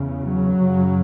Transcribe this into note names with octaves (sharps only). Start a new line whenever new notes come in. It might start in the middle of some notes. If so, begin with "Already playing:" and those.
Already playing: E2 C#3
F#3
F#2 C#3